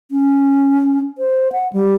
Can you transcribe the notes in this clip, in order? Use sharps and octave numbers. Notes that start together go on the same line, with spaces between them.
C#4
C5
F#5
G3